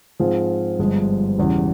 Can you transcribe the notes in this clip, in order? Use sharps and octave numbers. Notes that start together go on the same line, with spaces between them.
G#2 F3 C4 F4 G#4
G1 G2 F3 G#3
E1 E2 C#3 G3